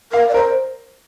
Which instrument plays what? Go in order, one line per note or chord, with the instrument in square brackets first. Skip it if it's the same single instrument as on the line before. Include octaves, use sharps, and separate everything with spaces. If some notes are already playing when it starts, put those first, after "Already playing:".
[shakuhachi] A#4 [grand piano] F5
[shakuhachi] D5
[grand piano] A#4 [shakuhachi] C5